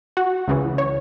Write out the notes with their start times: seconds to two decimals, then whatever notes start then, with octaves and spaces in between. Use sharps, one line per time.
0.17 F#4 F#5
0.48 C#2 C#3 E3
0.78 C#5